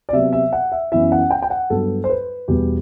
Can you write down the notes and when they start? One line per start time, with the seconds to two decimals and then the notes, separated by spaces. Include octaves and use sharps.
0.09 D5
0.13 C3 F#3 B3 E5
0.33 E5
0.53 F#5
0.72 E5
0.92 F#2 E3 B3 E4 E5
1.12 F#5
1.31 G5
1.42 G5
1.50 F#5
1.70 G2 F#3 B3 A4
2.04 C5
2.09 B4
2.48 E2 B2 G3 B3 G4